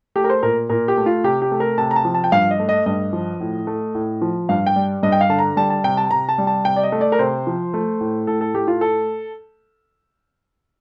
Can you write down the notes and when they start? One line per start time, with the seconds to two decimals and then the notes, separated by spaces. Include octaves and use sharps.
0.16 A3 G4
0.24 A#4
0.30 C5
0.43 A#2 A#4
0.69 A#2 A#4
0.88 G4
0.97 A3
1.06 F4
1.24 C3 G4
1.42 G4
1.52 A3
1.60 A#4
1.78 C3 A5
1.91 A#5
1.96 A5
2.05 F3
2.14 A5
2.24 G5
2.32 G2 F5
2.51 D#5
2.59 A3
2.69 D#5
2.86 G2 D#5
3.13 F3
3.41 A2
3.67 A3
3.95 A2
4.22 F3
4.49 G2 F5
4.66 G5
4.76 G3
5.03 G2 D#5
5.12 G5
5.21 F5
5.30 D3 A5
5.39 A#5
5.57 G3 A5
5.70 A5
5.84 C3 G5
5.97 A5
6.11 C3 A#5
6.29 A5
6.38 G3
6.47 A5
6.65 C3 G5
6.76 D5
6.84 D#5
6.92 A3
7.01 D5
7.12 A#4
7.19 C3 C5
7.47 F3
7.74 A3
8.01 A2
8.27 A2 A4
8.41 A4
8.54 A3 G4
8.68 F4
8.81 A4